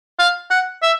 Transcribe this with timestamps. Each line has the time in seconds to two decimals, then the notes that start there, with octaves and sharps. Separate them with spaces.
0.19 F5
0.51 F#5
0.83 E5